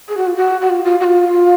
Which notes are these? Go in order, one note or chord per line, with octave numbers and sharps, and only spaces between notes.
G#4
F#4
F4
F#4
F#4
F4
F4
F#4
F4